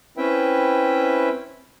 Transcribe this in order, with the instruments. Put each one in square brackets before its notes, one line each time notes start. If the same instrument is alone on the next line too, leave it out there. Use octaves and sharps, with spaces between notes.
[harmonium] C4 C#4 E4 B4 E5 G5